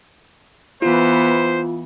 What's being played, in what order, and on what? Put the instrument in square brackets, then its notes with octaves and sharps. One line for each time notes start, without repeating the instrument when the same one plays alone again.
[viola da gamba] E3 B3 [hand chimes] F4 [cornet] C5